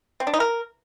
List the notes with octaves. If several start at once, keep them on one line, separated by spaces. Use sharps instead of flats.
C4
D4
D#4
A#4